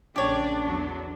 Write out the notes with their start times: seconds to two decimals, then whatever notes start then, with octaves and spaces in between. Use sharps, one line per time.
0.16 A#1 C#3 D4 G4 C#5 D5
0.65 E2 D3 F#3